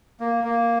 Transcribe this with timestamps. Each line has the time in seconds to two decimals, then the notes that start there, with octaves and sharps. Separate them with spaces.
0.20 A#3
0.44 A#3